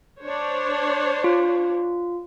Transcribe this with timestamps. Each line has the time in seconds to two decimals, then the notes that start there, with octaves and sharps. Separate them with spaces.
0.22 D4 C5 C#5
1.24 F4